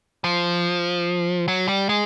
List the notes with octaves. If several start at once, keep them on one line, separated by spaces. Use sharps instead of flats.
F3
F#3
G3
G#3